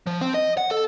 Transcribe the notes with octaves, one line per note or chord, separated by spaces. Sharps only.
F3
C4
D#5
F#5
A4